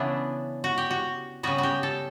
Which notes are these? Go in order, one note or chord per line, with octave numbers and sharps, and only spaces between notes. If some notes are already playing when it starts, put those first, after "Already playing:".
Already playing: C#3 E3 B3 D4 E4
F#4
G4
F#4
C#3 G3 B3 F#4
F#4 G4
A4